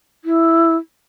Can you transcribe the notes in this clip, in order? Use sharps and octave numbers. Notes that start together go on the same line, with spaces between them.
E4